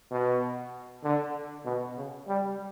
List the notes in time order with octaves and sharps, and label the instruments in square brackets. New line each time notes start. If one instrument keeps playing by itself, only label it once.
[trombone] B2
D3
B2
C#3
G3